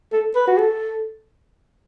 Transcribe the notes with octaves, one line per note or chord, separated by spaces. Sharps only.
A4
B4
F#4
A4